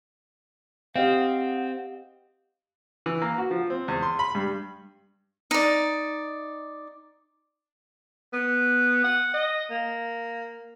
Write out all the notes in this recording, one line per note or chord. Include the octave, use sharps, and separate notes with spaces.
C4 G4 D#5 F5 F#5
E3
A#3
F#4
F3
C4
E2
C6
B5
G2
D#4 D5
B3
F#5
D#5
A#3